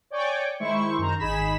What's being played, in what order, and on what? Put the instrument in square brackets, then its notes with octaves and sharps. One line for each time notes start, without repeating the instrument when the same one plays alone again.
[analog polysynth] C#5 D5 G5 G#5 C#6 D6
D#3 G#3 E4 C5 C#6
F#2 D#3 C5 A#5
G#1 D#4 G#4 B5 B6 E7